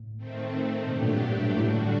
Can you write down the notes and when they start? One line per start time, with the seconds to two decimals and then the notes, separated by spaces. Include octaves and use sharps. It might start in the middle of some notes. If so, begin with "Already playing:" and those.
Already playing: A2
0.17 D#3 A3 C4
0.87 G2 A#2 F#3 A3 D4 G4
0.95 A2
1.03 A#2
1.57 A2 D3 G3 D4 F#4